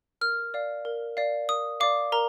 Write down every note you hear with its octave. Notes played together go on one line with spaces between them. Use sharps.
A#4 F6
D5 F5
A#4
D5 F5
A#4 D#6
D5 F5 D6
A#4 A#5